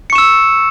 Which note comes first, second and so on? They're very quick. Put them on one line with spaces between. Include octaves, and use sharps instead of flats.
C#7 C#6 E7 E6